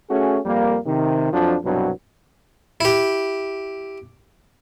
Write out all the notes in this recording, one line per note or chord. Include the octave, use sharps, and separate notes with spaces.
A3 C#4 F#4 G#4
F2 G3 A#3
C3 D#3
F2 F3 F#3 D4
C2 G2 B2 F#3
E4 G4